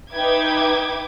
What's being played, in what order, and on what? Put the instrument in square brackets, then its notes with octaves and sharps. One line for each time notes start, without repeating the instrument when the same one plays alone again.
[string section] D#4 B4 E5 G5 D6 G#6